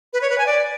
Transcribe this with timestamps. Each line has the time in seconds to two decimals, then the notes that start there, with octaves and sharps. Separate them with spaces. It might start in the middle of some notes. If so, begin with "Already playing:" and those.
0.13 B4
0.22 C#5
0.30 B4
0.38 G#5
0.47 D5